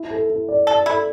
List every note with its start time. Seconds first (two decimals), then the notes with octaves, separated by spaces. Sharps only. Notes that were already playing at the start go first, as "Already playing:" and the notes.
Already playing: E4
0.11 A4
0.30 E4
0.48 D5
0.67 A4 D5
0.86 E4 A4